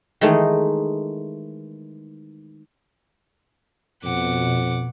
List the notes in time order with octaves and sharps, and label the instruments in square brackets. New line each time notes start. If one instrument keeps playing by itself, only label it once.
[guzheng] D#3 E3 G#3 A3 D#4 G#4
[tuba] F2 [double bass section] B2 [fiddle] F#5 D6